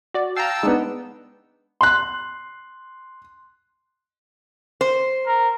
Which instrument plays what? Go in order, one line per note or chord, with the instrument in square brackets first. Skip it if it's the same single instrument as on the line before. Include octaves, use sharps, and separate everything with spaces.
[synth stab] F#4 D5
[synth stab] F5 A#5 [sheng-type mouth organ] G5 A5 E6
[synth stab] G#3 [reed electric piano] B3 D4 D#4
[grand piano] C6 F#6
[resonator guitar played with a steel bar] C5
[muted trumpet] A#4